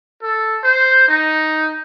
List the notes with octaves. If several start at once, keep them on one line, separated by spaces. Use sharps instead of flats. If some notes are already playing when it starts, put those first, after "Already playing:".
A4
C5
D#4